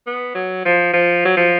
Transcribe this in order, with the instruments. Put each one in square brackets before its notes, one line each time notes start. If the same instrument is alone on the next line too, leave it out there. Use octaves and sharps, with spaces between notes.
[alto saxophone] B3
F#3
F3
F3
F#3
F3